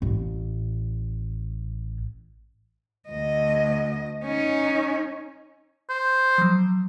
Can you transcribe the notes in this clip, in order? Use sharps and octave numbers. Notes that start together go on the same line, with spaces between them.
A1 A2
D2 D#5
C#4 D#4
C5
F3 F#3